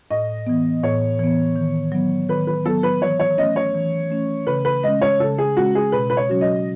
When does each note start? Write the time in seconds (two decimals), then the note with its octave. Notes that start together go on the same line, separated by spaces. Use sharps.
0.10 A2 D#5
0.47 E3 B3
0.83 A2 C#5
1.19 E3 B3
1.56 D#3
1.92 F#3 B3
2.29 D#3 B4
2.47 B4
2.65 F#3 B3 A4
2.83 B4
3.01 E3 C#5
3.20 C#5
3.38 A3 C#4 D#5
3.56 C#5
3.75 E3
4.11 A3 C#4
4.47 C#3 B4
4.65 B4
4.83 G#3 C#4 D#5
5.02 C#5
5.20 C#3 A4
5.38 G#4
5.57 G#3 C#4 F#4
5.75 G#4
5.92 B2 B4
6.10 B4
6.17 C#5
6.29 F#3 C#4 F#4
6.41 D#5